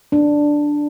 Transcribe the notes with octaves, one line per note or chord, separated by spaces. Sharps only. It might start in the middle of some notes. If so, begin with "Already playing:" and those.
D4